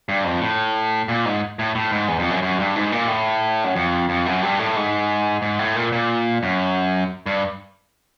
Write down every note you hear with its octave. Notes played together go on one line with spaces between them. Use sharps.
G2
F2
A2
A#2
G#2
A2
A2
G#2
E2
F2
F#2
F#2
G2
G#2
A#2
A2
F#2
F2
F2
F#2
G2
A2
G#2
G#2
A2
A#2
A#2
F#2
G2